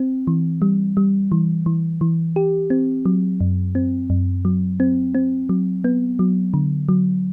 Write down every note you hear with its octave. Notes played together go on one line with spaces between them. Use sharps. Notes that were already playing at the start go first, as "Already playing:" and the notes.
Already playing: C4
E3
G3
G3
E3
E3
E3
G4
C4
F#3
F#2
C4
F#2
F#3
C4
C4
F#3
B3
F#3
D3
F#3